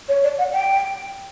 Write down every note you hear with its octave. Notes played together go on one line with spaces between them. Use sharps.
C#5
D5
F#5
G5